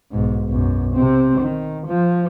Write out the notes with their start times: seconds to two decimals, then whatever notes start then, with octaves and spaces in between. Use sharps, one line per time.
0.11 B1 G#2
0.49 B1 F#2
0.96 C3 C4
1.41 D#3
1.87 F3